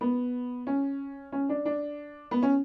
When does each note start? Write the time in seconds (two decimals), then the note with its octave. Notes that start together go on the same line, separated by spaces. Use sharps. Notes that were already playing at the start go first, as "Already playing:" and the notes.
0.01 B3
0.67 C#4
1.32 C#4
1.49 D4
1.65 D4
2.31 B3
2.43 C#4